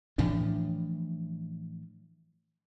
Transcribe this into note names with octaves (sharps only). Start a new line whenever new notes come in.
A2 E3 F3 D4